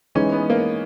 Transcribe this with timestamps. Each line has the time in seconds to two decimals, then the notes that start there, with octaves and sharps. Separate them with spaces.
0.15 E3 G#3 C#4 D#4
0.32 B3
0.50 A#3